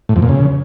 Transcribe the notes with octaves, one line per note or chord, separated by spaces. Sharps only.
A2
F2
A#2
C#3